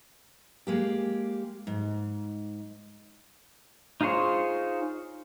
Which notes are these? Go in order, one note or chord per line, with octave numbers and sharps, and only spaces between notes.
G#3 A#3 G4
G#2
D#4 F4 G#4 C5 C#5